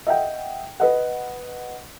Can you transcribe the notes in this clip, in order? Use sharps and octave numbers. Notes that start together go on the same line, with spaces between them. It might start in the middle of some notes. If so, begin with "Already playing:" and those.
D#5 E5 F#5 G5
B4 D#5 F#5